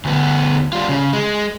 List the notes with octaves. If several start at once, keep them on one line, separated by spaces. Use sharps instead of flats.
D2 B3
G3 F4
C#3
G#3